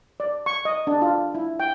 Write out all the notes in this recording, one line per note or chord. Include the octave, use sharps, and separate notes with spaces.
D5
C#6
D#5
D4
F4
E4
G5